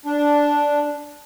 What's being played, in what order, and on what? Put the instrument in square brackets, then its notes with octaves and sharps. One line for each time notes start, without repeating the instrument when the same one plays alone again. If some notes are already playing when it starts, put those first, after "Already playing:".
[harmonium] D4